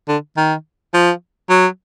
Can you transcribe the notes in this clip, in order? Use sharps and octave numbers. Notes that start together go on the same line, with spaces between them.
D3
D#3
F3
F#3